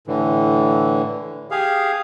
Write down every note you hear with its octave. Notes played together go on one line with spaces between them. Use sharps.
A2 D3 E3
G4 G#4 F5